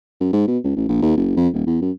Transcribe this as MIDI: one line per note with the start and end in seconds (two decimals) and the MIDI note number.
0.20 0.30 42
0.33 0.47 44
0.48 0.58 47
0.64 0.75 37
0.76 0.84 33
0.89 0.97 34
1.02 1.14 39
1.17 1.33 30
1.37 1.48 41
1.54 1.64 27
1.67 1.77 40
1.82 1.91 42